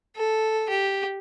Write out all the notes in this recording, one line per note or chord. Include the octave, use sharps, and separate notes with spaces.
A4
G4